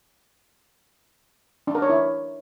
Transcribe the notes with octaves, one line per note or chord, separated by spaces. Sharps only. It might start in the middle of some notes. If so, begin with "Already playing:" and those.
D4
A#4
C#5
E4